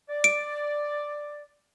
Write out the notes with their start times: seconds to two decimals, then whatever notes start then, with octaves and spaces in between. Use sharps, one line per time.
0.09 D5
0.24 D7